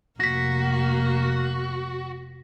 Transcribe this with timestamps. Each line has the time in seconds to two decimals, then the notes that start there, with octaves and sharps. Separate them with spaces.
0.20 F1 A#3 F#4 A#6 B6